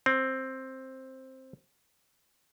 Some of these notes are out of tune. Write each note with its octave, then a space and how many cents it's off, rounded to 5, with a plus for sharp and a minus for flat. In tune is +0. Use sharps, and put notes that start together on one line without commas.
C4 +10